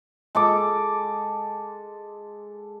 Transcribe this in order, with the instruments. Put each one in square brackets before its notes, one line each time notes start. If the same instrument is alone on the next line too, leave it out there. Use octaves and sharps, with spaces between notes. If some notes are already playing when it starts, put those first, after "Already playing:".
[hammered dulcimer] G#3 A4 D6